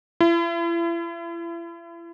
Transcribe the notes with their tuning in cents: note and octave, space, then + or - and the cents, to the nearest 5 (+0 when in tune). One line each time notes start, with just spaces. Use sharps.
E4 +40